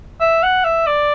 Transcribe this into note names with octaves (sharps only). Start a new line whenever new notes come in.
E5
F#5
E5
D5